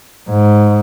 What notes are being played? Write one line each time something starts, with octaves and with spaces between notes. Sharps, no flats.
G#2